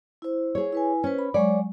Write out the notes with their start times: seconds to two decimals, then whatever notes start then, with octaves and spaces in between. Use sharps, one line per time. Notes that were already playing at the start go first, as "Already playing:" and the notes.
0.22 E4 C5
0.55 G#4 C#5
0.72 E4 B4 G#5
1.04 C#4 B4 C5
1.19 B5
1.34 F#3 G#3 C#5 D5 C#6